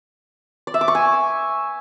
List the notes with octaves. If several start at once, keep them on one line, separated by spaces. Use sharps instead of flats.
D5
E5
D6
C#6
G#5